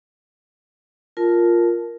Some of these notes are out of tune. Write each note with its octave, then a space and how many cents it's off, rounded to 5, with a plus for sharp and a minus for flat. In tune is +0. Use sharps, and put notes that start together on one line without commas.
F4 +0 A#4 +0 A5 -10